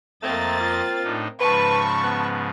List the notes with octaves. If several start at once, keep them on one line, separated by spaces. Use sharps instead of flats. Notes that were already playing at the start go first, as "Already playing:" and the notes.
F2 A3 A#3 C4 D#5 A6
F4
A2 D4 D#4
G#2 C#3 F3 B4 A5 B5 C#6
B3